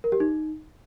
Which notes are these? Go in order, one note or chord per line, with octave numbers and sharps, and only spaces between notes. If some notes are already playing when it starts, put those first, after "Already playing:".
A#4
G4
D#4